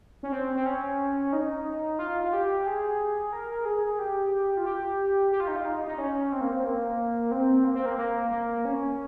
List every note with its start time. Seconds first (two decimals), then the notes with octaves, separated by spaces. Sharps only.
0.23 C#4
0.33 C4
0.56 C4
0.66 C#4
1.33 D#4
1.99 F4
2.24 F4
2.33 G4
2.66 G#4
3.33 A#4
3.65 G#4
3.99 G4
4.57 F4
4.66 G4
5.32 G4
5.40 F4
5.48 D#4
5.56 F4
5.65 D#4
5.87 D#4
5.98 C#4
6.32 C4
6.41 A#3
6.52 C4
6.65 A#3
7.32 C4
7.64 A#3
7.75 C4
7.86 A#3
7.98 A#3
8.31 A#3
8.65 C#4